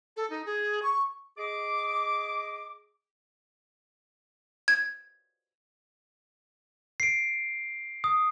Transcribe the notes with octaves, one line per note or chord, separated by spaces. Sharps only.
A4
D#4
G#4
C#6
G#4 D#5 D6
G#6
C7 D7
D#6